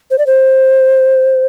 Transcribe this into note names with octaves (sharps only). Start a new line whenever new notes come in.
C5
D5
C5